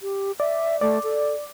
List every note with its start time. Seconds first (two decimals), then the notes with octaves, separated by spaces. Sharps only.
0.01 G4
0.40 D5 E5
0.81 A3 D5
1.03 A4